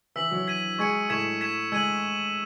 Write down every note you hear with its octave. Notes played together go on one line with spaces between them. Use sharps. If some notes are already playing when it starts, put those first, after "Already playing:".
E3 E4 E6 B6 F#7
F#3 F#4
G#6 B6 D#7
G#3 G#4 C#6 G#6 C#7
A2 A3 C#6 G#6 B6 E7
G#6 B6 E7
G#3 E6 G#6 D#7 F#7